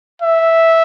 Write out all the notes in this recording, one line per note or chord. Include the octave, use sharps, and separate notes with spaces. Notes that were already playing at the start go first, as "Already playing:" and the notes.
E5